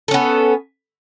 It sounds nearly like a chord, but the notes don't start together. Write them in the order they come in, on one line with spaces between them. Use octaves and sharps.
A4 C#4 B3